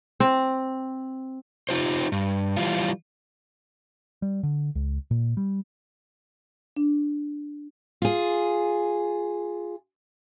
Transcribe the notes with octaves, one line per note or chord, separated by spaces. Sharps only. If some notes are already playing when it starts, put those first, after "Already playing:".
C4
D#4 F4 G4 C5
G2
E3 G3 F4
G3
D3
C#2
A#2
G3
D4
F4 G#4